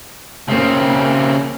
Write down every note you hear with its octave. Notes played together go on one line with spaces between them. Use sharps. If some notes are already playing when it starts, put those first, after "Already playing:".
C#3 A#3 C4 C#4